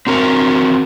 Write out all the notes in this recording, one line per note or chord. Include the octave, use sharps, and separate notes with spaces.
C4 F#4 A#4